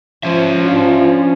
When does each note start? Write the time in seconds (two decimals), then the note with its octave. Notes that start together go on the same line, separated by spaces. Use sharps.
0.23 F3 C#4 E5
0.65 D4 F4